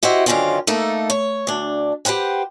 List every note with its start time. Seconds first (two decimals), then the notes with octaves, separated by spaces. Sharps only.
0.03 E4 F#4 G4 C5 D#5 E5
0.26 F#2 D3 D#3 C4 C#4 F4
0.67 A3 A#3 D#4 A4
1.10 C#5
1.47 D2 D4
2.05 G4 B4 C5 F#5 G5